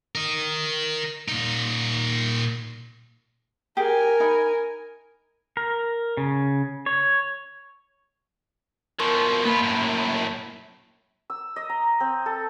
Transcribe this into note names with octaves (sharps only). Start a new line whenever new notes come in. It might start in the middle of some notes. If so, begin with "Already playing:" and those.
A#4 D#5
A#2 D#4
G4 G#4 A#4 G#5
D#4 B5
A#4
C#3
C#5
B2 F3 A#4 C#6
A#3 B3 F4 B5
F#2 A2
E6
D#5
A#5
C4
A4